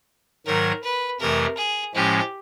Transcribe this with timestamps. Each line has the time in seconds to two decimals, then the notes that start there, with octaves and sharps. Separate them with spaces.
0.46 G#2 D#3 F#3 A#4
0.83 B4
1.20 F2 C3 E3 A3 A#4
1.57 G#4
1.95 A2 F3 G#3 C#4 G4